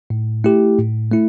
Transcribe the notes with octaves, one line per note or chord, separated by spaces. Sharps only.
A2
A3 E4 G4
A2
A3 E4